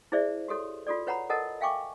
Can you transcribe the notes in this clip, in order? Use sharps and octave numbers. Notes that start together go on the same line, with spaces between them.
E4 G#4 C5 D5 E5
F#4 G4 A4 C#5
F4 F#4 A4 D5
B4 C#5 F#5 A#5 B5
A4 A#4 D#5 F#5 A5
E5 F5 G5 G#5 C#6 D6